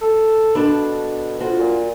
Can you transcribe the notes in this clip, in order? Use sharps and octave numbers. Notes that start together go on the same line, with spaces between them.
A4
B2 D4 A4 B4
F2 F4 F#4
A#2